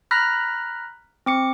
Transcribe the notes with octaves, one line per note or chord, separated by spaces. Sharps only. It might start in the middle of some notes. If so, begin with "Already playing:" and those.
A#5 B5 F6 F#6 A#6 B6
C4 D6 C#7